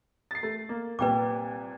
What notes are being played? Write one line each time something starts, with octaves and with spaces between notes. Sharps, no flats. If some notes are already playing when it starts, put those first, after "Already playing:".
A6 C7
A3
A#3
C2 A#2 B4 G5 D6